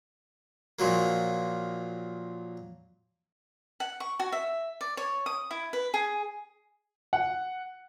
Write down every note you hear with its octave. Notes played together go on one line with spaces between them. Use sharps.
A#2 F3 F#3 A#3
F#5
C#6
F#4
E5
D5
C#5
D#6
E4
B4
G#4
F#5